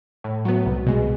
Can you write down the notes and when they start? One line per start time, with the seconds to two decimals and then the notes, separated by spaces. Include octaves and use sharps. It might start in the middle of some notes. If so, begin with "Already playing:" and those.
0.24 A2
0.45 F#3 B3
0.66 C2
0.86 B2 G#3